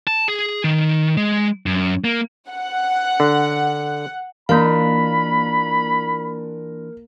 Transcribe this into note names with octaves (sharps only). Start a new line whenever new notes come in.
A5
G#4
D#3
G#3
F#2
A#3
F#5
D3
E3 A#3 D4 F4 A#4 F5 B5